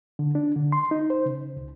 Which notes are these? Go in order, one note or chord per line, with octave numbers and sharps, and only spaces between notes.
D3
D4
D3
C6
D#4
C5
C#3
C#2